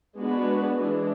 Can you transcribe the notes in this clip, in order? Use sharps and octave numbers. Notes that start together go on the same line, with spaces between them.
G#3 B3 D4 F#4 B4
E3 G#3 D4